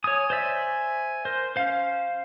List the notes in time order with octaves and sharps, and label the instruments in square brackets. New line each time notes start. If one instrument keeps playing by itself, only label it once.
[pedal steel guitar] C#5 D#6 [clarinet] G#5
[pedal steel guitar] C5 D5 E5
[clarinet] A#4 [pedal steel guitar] C5
[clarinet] C#4 [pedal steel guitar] C5 F5